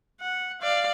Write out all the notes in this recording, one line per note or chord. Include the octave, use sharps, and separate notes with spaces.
F#5
D5 F5